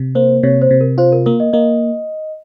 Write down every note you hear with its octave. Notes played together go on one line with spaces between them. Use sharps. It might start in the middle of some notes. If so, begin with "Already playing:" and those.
Already playing: C3
A#3 C5
C3 C#5
C5
C3
A#4
F4 C5
A#4
A#3 A#4
D#5
A#3 D#5